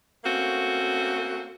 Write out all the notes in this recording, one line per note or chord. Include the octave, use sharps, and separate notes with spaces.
A3 A#3 C4 C#4 F#4